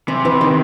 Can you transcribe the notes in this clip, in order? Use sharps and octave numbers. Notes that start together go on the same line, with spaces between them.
C3 E3
E3
D#3